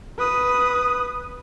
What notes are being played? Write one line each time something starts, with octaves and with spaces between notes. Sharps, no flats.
B4 D#6